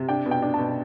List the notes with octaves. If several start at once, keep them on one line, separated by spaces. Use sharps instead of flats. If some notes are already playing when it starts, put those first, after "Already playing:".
Already playing: C3
D4 G5
B2
G5
D4
B2 A5